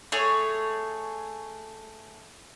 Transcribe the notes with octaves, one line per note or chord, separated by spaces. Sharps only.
A3 G#4 C#5